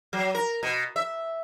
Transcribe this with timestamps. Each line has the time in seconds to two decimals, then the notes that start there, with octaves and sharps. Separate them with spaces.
0.13 F#3
0.35 A#4
0.63 B2
0.96 E5